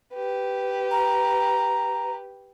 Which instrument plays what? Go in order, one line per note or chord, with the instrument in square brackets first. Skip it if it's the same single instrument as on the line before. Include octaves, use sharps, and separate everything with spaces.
[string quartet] G4 B4
[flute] A#5